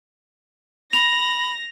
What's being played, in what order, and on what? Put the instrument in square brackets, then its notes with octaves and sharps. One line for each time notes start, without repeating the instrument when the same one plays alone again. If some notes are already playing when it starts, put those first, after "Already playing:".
[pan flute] B5 [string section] A#6 [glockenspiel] F7